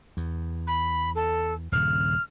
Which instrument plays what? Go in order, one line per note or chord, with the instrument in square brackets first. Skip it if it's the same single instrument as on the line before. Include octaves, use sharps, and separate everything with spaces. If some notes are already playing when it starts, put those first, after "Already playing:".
[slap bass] E2
[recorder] B5
A4
[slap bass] D#1 G2 C#3 [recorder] F6